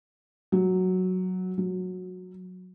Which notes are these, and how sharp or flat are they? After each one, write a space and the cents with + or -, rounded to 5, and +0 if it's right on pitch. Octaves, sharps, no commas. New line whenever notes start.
F#3 +0
F#3 -15